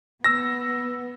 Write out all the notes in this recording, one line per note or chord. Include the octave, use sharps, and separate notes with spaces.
B3 E6 A#6